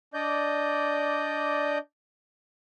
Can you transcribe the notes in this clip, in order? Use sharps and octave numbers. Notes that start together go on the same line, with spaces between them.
D4 D5 D#5 G6